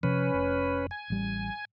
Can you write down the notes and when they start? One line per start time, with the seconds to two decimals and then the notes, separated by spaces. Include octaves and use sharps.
0.03 C3 F3 C#4 B4
0.34 F1
0.91 G#5
1.10 A1 G3